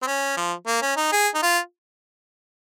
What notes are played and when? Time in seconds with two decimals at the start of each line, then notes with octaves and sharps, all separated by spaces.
0.02 C4
0.07 C#4
0.37 F3
0.67 A#3
0.82 C#4
0.97 D#4
1.12 G#4
1.35 D#4
1.42 F4